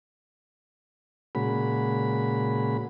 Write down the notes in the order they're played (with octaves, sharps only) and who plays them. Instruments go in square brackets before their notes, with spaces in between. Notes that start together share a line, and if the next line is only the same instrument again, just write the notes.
[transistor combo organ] A#2 C#3 G#3 F#4 B5